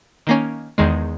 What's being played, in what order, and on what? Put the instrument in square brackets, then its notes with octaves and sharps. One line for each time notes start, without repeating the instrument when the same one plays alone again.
[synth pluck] D#3 A#3 C#4
E2 D#3 G#3